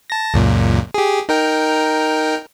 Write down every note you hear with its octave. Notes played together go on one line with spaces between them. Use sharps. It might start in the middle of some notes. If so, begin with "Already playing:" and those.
A5 A#6
C#2 F#2 A#2
G4 G#4
D#4 A#4 G5